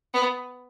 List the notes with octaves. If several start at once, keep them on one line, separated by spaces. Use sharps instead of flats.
B3